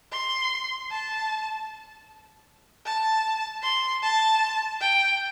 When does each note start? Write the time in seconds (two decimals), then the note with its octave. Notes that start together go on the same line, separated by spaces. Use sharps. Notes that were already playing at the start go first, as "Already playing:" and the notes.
0.12 C6
0.91 A5
2.86 A5
3.63 C6
4.03 A5
4.81 G5